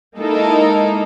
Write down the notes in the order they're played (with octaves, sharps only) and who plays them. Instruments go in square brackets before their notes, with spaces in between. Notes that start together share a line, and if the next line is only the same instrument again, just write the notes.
[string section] G#3 A#3 D#4 E4 A4 A#4